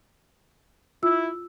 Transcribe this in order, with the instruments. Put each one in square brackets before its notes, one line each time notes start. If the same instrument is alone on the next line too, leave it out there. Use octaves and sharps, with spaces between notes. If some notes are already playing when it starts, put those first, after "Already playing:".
[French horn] E4 [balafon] F4 [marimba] E6